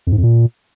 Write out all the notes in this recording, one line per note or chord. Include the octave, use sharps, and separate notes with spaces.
F2
G#2
F2
A#2